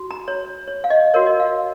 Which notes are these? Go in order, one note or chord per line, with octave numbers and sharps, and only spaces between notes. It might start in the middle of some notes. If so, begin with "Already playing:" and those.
Already playing: F#4
A#5
C#5
C#5
F5
D#5
F#4 A#4 C#5 F5
D#5
F5